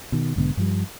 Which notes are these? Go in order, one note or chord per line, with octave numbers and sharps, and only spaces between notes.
B2 D#3
B1 G#2 D3 B3
G2 F3 G3